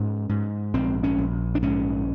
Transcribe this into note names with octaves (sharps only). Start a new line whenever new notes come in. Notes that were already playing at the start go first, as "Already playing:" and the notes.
Already playing: G#2 C#4
G#2
A#1 C4
C#4
A#1
D4
G#2 C#4